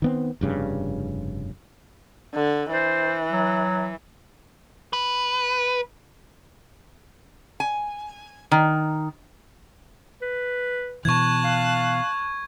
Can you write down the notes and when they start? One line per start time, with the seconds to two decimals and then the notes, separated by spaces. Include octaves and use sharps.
0.02 D#3 B3 C4
0.41 F1 G2 C#3
2.34 D3
2.71 E3 C5
3.31 F#3
4.93 B4
7.60 G#5
8.51 D#3
10.22 B4
11.05 B2 E3 A5 C#6 F#6 G#6
11.44 F5